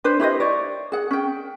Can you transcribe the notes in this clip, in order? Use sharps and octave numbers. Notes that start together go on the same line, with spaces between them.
D4 B4 C5
E4 G4 C5 D#5
C#5 D5
G#4 F#5
C#4 G5